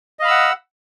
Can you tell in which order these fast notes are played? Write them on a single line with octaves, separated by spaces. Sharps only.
D#5 F5 B5 E6 F#5